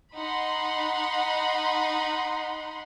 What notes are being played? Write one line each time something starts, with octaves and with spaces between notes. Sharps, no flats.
D#4 F#5 B5 C6